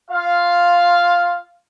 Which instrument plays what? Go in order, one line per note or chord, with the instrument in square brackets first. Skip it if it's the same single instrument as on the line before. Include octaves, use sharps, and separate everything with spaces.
[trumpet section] F4 F5